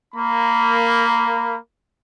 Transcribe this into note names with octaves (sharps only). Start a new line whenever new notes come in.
A#3 B5